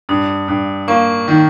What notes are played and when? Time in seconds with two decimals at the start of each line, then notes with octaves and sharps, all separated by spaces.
0.09 G2 D#6
0.48 G2
0.88 A#3 C#6
1.28 D#3